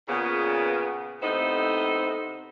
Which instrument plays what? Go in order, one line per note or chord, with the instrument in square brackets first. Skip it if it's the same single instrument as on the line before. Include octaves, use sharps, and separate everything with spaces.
[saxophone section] A#2 C#3 B3
A2 C3 B3 D#4 A4 C5